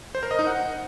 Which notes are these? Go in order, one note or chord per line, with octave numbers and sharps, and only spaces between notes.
C5
A#4
D#5
D#4
F#5